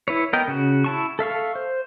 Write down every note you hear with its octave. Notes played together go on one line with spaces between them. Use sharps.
E4 B4 C#5
B3 A#4 D#5 G5
C#3 F#4
E4 A5 C#6
A4 E5 F5 C#6
C5